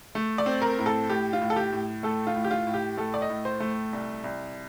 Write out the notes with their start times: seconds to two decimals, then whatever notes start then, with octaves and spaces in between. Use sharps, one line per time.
0.15 A3
0.38 D5
0.46 C4
0.62 A#4
0.79 A2
0.86 A4
1.10 A2 G4
1.33 F4
1.41 A2
1.50 A4
1.56 G4
1.72 A2
2.03 A3 A4
2.27 F4
2.36 A2
2.44 G4
2.51 F4
2.67 A2
2.74 G4
2.97 A3 A4
3.14 D5
3.22 D#5
3.29 A2
3.45 C5
3.60 A3
3.93 C2
4.24 C2